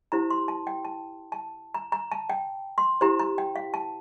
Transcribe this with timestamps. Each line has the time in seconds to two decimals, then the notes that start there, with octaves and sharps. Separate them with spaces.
0.12 E4 G4 C5 A#5
0.30 C6
0.48 A5
0.67 G5
0.85 A5
1.32 A5
1.74 A#5
1.92 A#5
2.12 A5
2.30 G5
2.78 C6
3.01 E4 G4 C5 A#5
3.19 A#5
3.38 G5
3.56 F5
3.74 A5